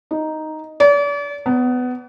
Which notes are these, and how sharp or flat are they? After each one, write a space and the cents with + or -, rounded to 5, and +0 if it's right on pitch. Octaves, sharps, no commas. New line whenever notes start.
D#4 +0
D5 -40
B3 +20